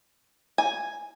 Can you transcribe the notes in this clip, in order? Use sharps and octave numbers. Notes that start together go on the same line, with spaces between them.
G#5